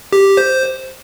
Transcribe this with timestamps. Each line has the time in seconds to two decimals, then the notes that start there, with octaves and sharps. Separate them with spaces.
0.13 G4
0.37 C5